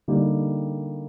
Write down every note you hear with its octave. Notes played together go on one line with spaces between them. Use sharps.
D3 G3 A#3 D#4 G4